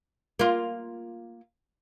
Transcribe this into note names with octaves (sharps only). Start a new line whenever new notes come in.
A#3 F4